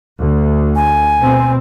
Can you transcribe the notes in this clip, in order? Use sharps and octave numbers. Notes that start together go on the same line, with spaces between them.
D2
G#5
B2 C4